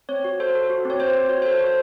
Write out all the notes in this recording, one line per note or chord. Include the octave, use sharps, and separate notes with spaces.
C4 C#5
F#4
A4 C5
A4
F#4
C4 C#5
C4 C5
C4
F#4 C#5
A4 C5
A4
F#4
C5